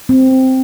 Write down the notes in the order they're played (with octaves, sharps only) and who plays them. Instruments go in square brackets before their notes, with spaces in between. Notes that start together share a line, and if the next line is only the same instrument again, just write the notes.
[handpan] C4